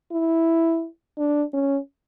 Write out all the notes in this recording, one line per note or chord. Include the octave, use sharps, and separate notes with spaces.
E4
D4
C#4